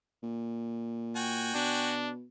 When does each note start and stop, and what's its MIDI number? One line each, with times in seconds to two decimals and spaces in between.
0.23 1.52 46
1.16 1.93 66
1.16 1.93 79
1.16 1.93 80
1.55 2.25 47
1.55 2.11 62